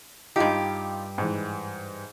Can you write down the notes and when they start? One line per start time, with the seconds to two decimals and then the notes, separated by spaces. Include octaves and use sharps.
0.36 G2 D#4 F4 G4 D#5
1.18 G#2 E3